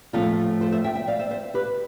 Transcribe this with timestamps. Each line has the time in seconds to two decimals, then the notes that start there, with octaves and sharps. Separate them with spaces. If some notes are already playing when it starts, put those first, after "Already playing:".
0.13 A2 F3 A3 C4 F4 A4
0.61 A4 C5
0.72 C5 E5
0.84 E5 G5
0.95 E5 G5
1.07 D5 F5
1.19 C5 E5
1.31 C5 E5
1.54 G4 B4